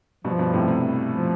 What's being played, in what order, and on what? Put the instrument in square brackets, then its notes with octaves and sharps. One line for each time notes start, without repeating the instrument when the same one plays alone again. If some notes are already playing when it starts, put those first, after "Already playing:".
[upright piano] G2 B2 [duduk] F3
[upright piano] G2 B2
A2 C3
A2 C3
[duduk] F3